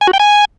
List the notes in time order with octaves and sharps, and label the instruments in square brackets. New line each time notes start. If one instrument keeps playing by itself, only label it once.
[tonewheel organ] G#5
F#4
G5
G#5